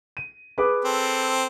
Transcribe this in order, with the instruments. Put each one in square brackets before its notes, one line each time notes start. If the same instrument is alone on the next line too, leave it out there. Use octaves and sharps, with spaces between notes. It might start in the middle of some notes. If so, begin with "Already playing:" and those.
[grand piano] D#7
G#4 B4 D6
[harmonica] C4 A4